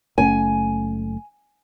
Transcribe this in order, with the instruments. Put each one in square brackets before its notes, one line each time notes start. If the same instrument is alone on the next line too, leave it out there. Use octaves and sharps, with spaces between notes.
[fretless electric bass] F#1 A3 C#4 [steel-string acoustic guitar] G#5